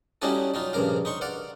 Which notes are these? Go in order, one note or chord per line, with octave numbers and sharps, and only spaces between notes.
G3 C#4 D#4 E4 F#4 A4
F#3 D#4 F4
A#1 G2 C#3 A#4 F5
D#4 C6 C#6
D5 F5 F#5